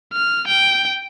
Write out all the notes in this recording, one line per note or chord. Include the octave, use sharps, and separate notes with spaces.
F6
G5